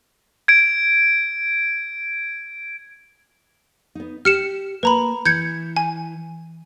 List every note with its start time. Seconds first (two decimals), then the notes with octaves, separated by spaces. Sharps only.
0.48 G#6 D7
3.95 B3 D#4
4.25 G4 F6 C#7 E7
4.83 A#3 B4 A#5 B5
5.26 E3 G6 G#6 C#7
5.76 G#5